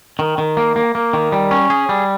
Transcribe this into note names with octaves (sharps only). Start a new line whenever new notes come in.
D#3
D#3
A#3
A#3
A#3
D#3
G3
C#4
G#4
G3